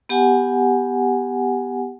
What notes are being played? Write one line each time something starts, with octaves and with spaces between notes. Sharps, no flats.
B3 G4 F#5 G#5